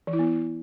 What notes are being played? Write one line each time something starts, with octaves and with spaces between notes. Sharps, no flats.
E3
E4
B3